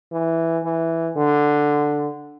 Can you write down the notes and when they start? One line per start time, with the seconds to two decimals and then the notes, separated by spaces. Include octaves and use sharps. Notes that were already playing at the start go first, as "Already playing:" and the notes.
0.12 E3
0.64 E3
1.16 D3